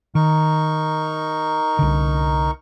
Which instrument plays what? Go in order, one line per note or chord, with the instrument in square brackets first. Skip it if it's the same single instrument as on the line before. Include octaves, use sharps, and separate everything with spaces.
[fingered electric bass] D#3 [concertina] D#4 A#4 C#6
[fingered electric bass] C2 D3